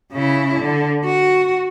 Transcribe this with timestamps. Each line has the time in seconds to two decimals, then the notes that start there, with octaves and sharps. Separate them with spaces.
0.13 C#3 E4
0.60 D3
1.05 F#4